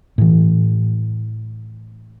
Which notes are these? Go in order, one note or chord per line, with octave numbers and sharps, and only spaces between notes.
A2 E3